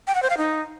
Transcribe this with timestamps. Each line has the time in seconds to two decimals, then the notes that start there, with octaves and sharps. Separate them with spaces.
0.07 G5
0.15 F#5
0.22 C5
0.30 F5
0.38 D#4